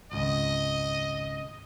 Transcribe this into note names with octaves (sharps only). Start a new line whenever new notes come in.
G#1 C#2 D#5